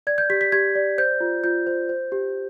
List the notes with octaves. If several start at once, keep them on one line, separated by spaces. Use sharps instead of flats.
D5 G#6
G6
G4 B6
B6
G4 G#6
D5
C5 G6
F4
F4 G6
C5
C5
G4